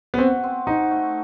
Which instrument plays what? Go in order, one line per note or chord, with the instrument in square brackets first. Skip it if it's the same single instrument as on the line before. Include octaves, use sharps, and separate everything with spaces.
[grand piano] B3
[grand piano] C4 [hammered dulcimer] F#4
[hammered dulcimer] C4
[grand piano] D#4 [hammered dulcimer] F#4
[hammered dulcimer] A3